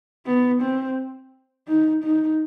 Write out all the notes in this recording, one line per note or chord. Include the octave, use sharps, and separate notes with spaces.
B3
C4
D#4
D#4